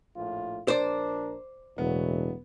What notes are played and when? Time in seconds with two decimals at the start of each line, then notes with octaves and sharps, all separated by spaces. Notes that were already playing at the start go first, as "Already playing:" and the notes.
0.16 A#1 A2 F4
0.68 A#1 D4 A#4 C5 D5
1.78 E1 A2 F#3 B3